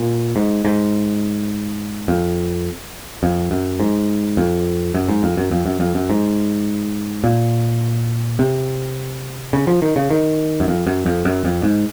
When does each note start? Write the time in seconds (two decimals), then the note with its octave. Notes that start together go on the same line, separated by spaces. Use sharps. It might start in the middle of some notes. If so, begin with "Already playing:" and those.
Already playing: A#2
0.36 G#2
0.65 G#2
2.08 F2
3.23 F2
3.51 F#2
3.80 G#2
4.37 F2
4.94 F#2
5.09 G#2
5.23 F2
5.37 F#2
5.51 F2
5.66 F#2
5.80 F2
5.95 F#2
6.10 G#2
7.24 A#2
8.39 C3
9.53 C#3
9.67 F3
9.82 D#3
9.96 C#3
10.11 D#3
10.60 F#2
10.68 F2
10.87 F#2
11.06 F2
11.25 F#2
11.45 F2
11.63 G#2